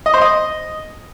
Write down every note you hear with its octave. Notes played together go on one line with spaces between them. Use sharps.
D#5
C5
D#5